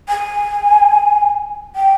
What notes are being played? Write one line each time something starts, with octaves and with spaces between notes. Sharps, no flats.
G#5
G5